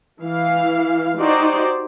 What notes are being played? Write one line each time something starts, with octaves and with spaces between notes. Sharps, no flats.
E3 F5
D#4 F#4 G4 C5 D5